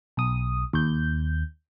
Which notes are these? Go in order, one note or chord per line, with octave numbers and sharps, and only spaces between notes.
B1 D#6
D#2 G6